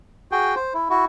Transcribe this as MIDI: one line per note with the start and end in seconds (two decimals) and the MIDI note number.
0.32 0.55 66
0.32 0.55 68
0.32 0.55 79
0.56 0.73 72
0.74 0.89 64
0.90 1.05 64
0.90 1.05 66